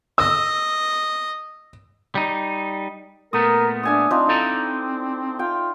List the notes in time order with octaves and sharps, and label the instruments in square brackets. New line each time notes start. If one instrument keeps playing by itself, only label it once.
[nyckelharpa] D#5 [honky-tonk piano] E6
[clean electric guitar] G3 D#4
[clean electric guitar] A#2 A3 B3 [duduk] A#4 [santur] D#6
[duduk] D4 [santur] E5 G#5 D#6
[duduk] C4 [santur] D4 D#4 F4
[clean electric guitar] D#4 A4 A#5 [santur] E4
[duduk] F4 [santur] G5